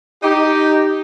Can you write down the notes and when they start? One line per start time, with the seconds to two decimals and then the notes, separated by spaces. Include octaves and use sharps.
0.22 D#4 G4